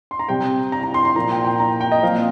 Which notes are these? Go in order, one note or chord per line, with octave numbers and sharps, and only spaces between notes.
C6
A#5
C3 G3 C4 G5
A#5
A#5
C6
C6
A#2 F3 A#3 A#5
G5
G5
A#5
G5
D#5
A#2 F3 C4 F5